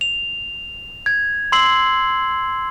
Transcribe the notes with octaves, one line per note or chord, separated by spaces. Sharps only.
F7
G#6
C6 E6 C7 F#7